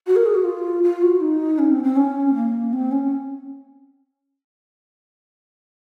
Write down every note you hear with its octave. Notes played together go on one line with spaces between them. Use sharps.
F#4
A#4
G#4
F#4
F4
F4
F#4
D#4
C#4
C4
C4
C#4
A#3
C4
C#4